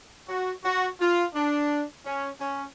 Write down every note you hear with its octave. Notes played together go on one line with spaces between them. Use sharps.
F#4
F#4
F4
D4
C#4
C#4